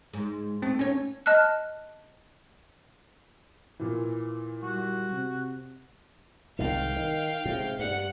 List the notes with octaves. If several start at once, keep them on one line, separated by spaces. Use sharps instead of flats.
G#2
A3 C4
D#2 C#4 C#5
D#5 A5 F6 F#6
A#2 E3
G3 F#4
C3
C2 G#2 D#3 F5 G5
D#3
G#2 C3
G2 F#5